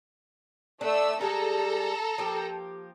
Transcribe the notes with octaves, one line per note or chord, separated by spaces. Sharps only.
A3 D4 E6
G3 G#3 G#4 A4 A#5
F3 A#3 G4